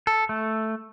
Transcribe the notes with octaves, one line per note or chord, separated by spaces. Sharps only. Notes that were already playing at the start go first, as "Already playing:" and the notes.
A4
A3